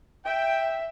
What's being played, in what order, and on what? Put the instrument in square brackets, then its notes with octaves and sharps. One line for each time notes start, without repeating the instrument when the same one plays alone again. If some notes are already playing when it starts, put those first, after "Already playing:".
[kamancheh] E5 [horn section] G5